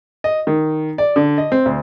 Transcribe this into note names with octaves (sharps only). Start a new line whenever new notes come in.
D#5
D#3
D5
D3
D#5
C4
D2